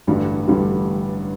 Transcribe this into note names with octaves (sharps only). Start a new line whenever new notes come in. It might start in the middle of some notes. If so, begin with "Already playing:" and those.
A1 G2 D3 G3
A1 G2 D3 G3